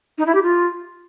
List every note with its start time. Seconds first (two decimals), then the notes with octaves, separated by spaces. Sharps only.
0.18 D#4
0.26 E4
0.34 G4
0.42 F4